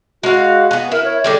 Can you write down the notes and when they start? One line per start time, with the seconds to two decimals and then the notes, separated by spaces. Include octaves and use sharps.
0.23 G#3 F#4 F5
0.71 B3 G#4
0.92 E4 A#4
1.04 C#5
1.24 D3 G3 G#3